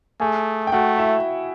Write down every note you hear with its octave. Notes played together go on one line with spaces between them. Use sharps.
A3 G#4 G#5
G5
A3 F#4 F#5
E4 E5